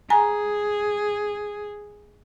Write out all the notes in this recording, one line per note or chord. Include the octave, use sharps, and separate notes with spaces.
G#4 G#5 A#5